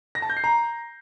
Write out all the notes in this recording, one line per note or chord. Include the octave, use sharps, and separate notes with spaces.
A#6
A5
G6
C7
A#5